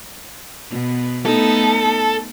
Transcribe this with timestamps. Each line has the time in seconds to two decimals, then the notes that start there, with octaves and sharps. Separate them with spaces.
0.70 B2 B3
1.26 A3 B3 D#4 A4